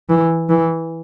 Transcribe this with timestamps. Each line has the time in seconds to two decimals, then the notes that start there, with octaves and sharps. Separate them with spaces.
0.09 E3
0.49 E3